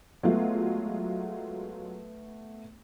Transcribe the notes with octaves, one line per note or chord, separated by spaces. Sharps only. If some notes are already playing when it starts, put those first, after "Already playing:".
F#3 G#3 A3 B3 F4